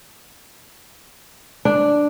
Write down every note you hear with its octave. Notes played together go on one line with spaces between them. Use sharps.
D4